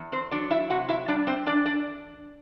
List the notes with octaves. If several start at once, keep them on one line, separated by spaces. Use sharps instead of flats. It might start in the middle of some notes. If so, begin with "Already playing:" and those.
Already playing: E2
C4 C5
F#3 D4 D5
E4 E5
C3 F#4 F#5
E4 E5
G3 D4 D5
C4 C5
E3 D4 D5
D4 D5